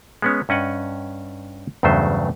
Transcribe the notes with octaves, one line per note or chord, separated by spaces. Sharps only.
G#3 B3 C#4
G2 C#4 D#5 F#5
E2 G2 C#3 F#3 A3 C5